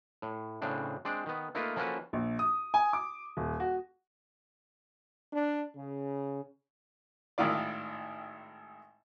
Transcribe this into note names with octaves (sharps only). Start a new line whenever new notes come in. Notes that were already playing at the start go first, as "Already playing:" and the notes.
A2
A2 C#3 C4 D4
G#3 C4 D4 D5
D#3 B3
A3 A#3 D#4 F4 A#4 B4
F3 A#3 C#4 F#4 A4 B4
A#1
D#6
G#5
D6
D#1
F#4
D4
C#3
G#1 A2 D#3 E4 F4 D5